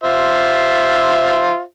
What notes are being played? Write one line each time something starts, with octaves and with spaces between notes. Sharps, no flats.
F4 C5 E5